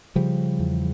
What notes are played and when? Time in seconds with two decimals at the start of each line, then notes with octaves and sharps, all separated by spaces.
0.15 C#3 F3 G3
0.59 E2